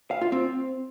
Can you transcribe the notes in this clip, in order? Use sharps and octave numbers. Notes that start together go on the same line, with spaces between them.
F5
F4
C4